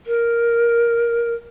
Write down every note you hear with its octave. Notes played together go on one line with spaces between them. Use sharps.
A#4